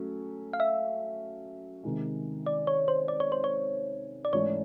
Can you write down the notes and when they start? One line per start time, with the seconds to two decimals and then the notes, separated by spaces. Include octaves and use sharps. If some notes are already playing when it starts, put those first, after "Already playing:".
Already playing: F#3 A3 C#4
0.53 F5
0.60 E5
1.84 C3 D#3 G#3
2.46 D5
2.67 C#5
2.88 C5
3.08 D5
3.20 C#5
3.32 C5
3.44 C#5
4.25 D5
4.33 G#2 E3 A3 C#4 C#5